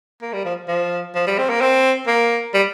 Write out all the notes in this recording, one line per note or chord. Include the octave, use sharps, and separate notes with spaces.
A#3
G3
F3
F3
F3
G3
C4
A#3
C4
A#3
G3